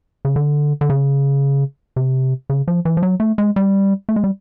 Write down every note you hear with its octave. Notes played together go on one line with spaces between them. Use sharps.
C#3
D3
D3
C#3
C3
C#3
F3
E3
F3
F#3
A3
G#3
G3
A3
G#3
G3